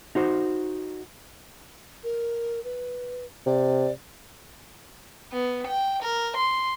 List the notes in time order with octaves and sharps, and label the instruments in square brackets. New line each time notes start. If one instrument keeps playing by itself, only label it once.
[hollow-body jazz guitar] D#4 F#4 C5
[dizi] A#4
B4
[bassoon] C3 [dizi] D5
[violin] B3
G5
A#4
C6